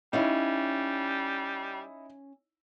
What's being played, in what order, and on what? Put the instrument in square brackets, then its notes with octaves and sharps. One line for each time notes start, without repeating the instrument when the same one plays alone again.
[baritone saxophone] G3 [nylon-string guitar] C#4 F5 [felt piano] D#4 E4 D#5